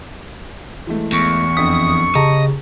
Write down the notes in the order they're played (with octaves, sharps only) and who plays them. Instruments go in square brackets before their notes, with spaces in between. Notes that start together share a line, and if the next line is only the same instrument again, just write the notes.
[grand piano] E3 G#3 A3
[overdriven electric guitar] E2 [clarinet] C#6
[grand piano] F2 D4 B6 [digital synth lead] D#6
[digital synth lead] C#3 [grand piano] G4 A5 A#5 [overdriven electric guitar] D#5